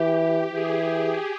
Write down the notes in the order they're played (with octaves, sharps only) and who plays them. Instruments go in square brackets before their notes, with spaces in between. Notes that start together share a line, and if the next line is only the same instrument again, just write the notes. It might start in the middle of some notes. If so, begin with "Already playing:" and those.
Already playing: [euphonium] E3 [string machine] G4
[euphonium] E3 [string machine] G#4